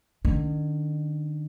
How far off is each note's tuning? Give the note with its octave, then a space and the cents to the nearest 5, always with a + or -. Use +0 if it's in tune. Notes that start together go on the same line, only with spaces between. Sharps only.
D#3 -45 C#4 +40